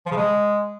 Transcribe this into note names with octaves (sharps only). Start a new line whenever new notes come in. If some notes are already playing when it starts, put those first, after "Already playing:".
F3
C#3
G#3